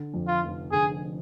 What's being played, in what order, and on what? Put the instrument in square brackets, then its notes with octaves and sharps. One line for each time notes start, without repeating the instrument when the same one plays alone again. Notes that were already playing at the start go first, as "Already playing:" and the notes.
Already playing: [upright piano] D3
F2
[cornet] F4
[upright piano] F1
[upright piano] D3 [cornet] G#4